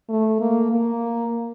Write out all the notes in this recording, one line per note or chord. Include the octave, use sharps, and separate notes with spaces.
A3
A#3
A#3